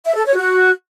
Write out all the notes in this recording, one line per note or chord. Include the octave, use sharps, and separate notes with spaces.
E5
A4
C#5
F#4